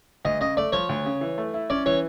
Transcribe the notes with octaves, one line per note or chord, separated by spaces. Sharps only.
D2 D#5
C#3 D#5
A3 D5
F3 C#5
D2
C#3
E3
A3
E4
C#4 D5
E3 C#5